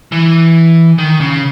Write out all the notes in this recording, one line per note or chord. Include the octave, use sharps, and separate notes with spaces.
E3
D#3
C#3